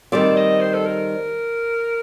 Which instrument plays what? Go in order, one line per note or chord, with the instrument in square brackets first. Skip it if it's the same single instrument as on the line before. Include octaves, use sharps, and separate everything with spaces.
[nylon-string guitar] D#3 G3 C4 [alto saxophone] D5
[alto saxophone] D#5
C5
A4
A#4